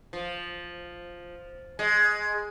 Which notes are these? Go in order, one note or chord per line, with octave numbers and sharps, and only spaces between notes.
F3
G#3